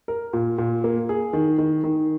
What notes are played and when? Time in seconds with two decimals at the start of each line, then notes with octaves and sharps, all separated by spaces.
0.08 A#4
0.33 A#2
0.58 A#2
0.84 A#3
1.09 G#4
1.33 D#3
1.58 D#3
1.84 D#3